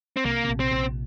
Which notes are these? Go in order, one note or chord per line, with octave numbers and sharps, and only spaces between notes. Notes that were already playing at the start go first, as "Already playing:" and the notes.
C4
C2 C3 A#3
C3
A#1 A#2
C4
A#1 A#2